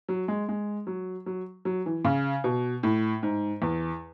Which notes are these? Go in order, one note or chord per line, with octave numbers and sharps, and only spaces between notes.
F#3
G#3
G#3
F#3
F#3
F#3
E3
C#3
B2
A2
G#2
E2